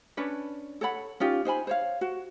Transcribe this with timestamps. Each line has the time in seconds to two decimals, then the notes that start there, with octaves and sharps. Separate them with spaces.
0.17 C#4 D4 B4 C#5
0.81 A4 C#5 F#5 B5
1.20 C#4 D#4 F4 G4
1.45 D#4 C5 G#5 B5
1.67 C5 C#5 F5
2.01 F#4